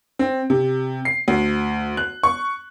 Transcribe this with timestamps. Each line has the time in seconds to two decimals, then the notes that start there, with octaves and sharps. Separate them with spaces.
0.19 C4
0.50 C3
1.05 C7
1.28 D2
1.97 F#6
2.23 C#6